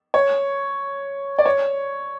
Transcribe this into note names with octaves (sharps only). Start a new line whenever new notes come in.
C#5
D5
C#5